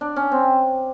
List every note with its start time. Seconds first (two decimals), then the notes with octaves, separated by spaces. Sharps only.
0.01 D4
0.16 C#4
0.32 C4